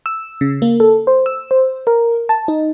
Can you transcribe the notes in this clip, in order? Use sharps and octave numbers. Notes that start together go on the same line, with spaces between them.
E6
C#3
A#3
A4
C5
E6
C5
A#4
A5
D#4